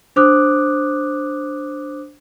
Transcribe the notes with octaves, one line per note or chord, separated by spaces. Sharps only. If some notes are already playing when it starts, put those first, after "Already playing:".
D4 C5 D6 D#6 F#6